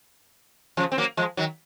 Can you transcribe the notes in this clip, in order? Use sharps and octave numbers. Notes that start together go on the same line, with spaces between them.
C#3 F3
C4
F#3 A#3
F3 G#3
D#3 F#3